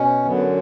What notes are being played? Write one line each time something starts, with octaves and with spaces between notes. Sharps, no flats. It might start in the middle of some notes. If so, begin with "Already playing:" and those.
Already playing: B2 C#4
F#2 D3 F#3 B3